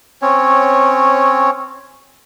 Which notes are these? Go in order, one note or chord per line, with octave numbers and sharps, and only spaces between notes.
C4 C#4 C#5